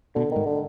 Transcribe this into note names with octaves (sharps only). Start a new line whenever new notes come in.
B2 D3
G#2 D#3
D3